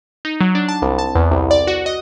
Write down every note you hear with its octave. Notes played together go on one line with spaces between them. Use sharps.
D#4
F#3
D4
A5
C2
A5
E2
C2
D5
F#4
D#5